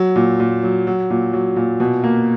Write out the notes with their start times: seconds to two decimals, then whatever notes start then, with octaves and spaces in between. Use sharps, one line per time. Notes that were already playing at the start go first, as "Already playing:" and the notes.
Already playing: F#3
0.16 A#2
0.40 A#2
0.63 F#3
0.87 F#3
1.10 A#2
1.33 F#3
1.56 A#2
1.80 B2
2.04 A#3